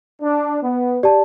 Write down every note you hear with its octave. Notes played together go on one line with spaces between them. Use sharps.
D4
B3
G4 D5 A5